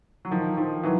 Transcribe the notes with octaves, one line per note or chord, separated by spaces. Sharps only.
F#3
D#3 F3
D#3 F3
E3 F#3